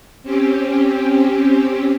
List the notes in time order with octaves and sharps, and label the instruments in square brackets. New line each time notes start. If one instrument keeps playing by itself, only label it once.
[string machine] C4 C#4 G4